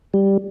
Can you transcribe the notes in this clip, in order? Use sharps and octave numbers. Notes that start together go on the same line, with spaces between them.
G3